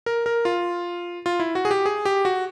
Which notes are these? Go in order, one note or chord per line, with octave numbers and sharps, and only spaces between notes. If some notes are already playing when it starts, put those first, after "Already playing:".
A#4
A#4
F4
F4
E4
F#4
G#4
G4
G#4
G4
F#4